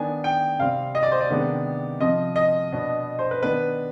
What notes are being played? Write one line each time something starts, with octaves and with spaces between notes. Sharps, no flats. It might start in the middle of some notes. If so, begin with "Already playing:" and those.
Already playing: D#3 B3 D4 G#5
G5
C3 G3 C4 F5
D#5
D5
C5
D5
C3 D#3 G#3 B3 D4
C3 F3 C4 D#5
D#5
B2 B3 D4
C5
B4
D#3 B3 D4 B4